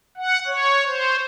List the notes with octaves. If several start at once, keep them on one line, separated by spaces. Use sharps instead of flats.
F#5
C#5
C5